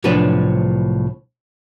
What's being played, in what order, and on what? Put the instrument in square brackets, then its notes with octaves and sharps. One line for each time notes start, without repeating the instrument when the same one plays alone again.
[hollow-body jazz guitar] C2 A2 F3 F#3 D4 B4